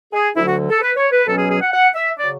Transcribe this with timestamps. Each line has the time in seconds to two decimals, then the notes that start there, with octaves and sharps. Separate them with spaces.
0.13 G#4
0.35 D2 D3 F#3 E4
0.47 F#4
0.70 A4
0.81 B4
0.96 C#5
1.11 B4
1.26 B2 F#3 C#4 A4
1.37 G#4
1.50 G#4
1.61 F#5
1.72 F#5
1.94 E5
2.18 C#3 F#3 D5